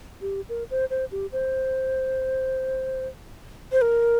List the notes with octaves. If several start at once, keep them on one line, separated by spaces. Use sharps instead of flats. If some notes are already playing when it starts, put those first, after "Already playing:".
G4
A#4
C5
C5
G4
C5
C5
A#4